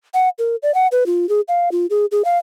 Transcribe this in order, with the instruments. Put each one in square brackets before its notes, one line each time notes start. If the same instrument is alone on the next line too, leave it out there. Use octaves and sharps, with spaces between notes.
[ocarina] F#5
A#4
D5
F#5
B4
F4
G#4
F5
F4
G#4
G#4
F5